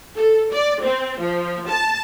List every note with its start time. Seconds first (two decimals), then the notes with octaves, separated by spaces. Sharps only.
0.16 A4
0.52 D5
0.82 C4
1.20 F3
1.67 A5